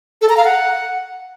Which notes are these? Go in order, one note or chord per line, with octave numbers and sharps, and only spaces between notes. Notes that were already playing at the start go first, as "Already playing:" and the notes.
A4
A#5
F5
F#5